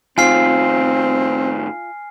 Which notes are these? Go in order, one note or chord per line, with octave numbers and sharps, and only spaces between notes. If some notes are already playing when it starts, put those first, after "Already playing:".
A2 D#3 C4 F4 G#5 F6 C7